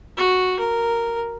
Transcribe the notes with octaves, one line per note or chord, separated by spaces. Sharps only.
F#4
A#4